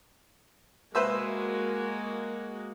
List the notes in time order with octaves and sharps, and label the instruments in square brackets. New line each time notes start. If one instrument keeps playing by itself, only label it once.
[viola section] G#3 A#3 F#4 [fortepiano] B4 C5 E5